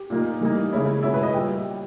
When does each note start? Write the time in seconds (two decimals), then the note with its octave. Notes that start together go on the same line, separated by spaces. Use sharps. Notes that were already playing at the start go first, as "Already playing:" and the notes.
Already playing: G4
0.10 A#2 A#3 D#4
0.41 E3 G3 A#3 D#4
0.72 C#3 G#3 C#4 E4
1.03 B2 G#3 C#4 E4
1.14 B4
1.23 D#5
1.33 A#2 G3 G5